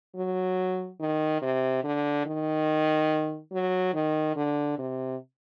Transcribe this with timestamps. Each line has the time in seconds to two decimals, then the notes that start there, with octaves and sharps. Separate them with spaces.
0.16 F#3
1.00 D#3
1.42 C3
1.84 D3
2.26 D#3
3.52 F#3
3.94 D#3
4.36 D3
4.78 C3